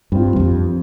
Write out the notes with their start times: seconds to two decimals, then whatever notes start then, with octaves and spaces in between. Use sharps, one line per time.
0.12 G2 G3 C4 F4
0.36 E2
0.40 F2